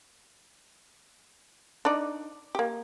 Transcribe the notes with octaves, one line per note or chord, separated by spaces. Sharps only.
D4 D#4 D5
A#3 G4